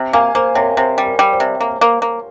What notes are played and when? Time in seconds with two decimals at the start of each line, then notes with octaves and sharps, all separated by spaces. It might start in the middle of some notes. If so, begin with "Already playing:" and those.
Already playing: C3
0.13 A#3 F5 G#5
0.35 A#3 C5
0.55 C3 A#4 C#5
0.77 C3 C5
0.98 G3
1.05 A#4
1.19 G3
1.33 C5
1.40 C3
1.61 A#3
1.81 A#3
2.02 A#3